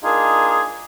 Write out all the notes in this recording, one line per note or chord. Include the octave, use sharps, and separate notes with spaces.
A#3 D4 D#4 F4 G#4